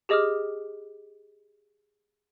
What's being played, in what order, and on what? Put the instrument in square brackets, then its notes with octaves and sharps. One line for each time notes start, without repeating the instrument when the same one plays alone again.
[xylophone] G4 G#4 D#5 D6 D#6 F6